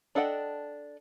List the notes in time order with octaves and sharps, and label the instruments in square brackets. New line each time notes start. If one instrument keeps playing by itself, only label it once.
[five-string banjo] D4 A4 D#5 F#5 G5